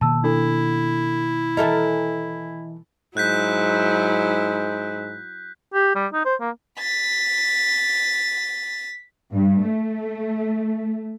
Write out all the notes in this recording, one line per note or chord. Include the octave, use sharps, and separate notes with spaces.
B2 D#3 A#3 A5 E6
D4 E4 A4
E3 A4 A#4 D#5 E5
G#2 F#3 E4 F#6 G6 B6
G4
G3
D#4
C5
A#3
A6 B6
G2
A3